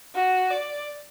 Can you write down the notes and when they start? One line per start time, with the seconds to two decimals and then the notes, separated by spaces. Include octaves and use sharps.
0.16 F#4
0.51 D5